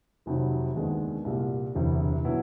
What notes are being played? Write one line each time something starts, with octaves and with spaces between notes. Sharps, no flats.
F1 F2 C3 D#3 F#3
D#2 D#3 G#3 B3 D4
C2 A#2 G3
E1 D2 C3 E3
B2 F#3 B3 E4